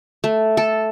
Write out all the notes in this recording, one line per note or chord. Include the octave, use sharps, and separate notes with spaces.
A3
A4